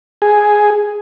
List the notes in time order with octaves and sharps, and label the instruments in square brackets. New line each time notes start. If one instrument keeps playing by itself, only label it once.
[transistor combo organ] G#4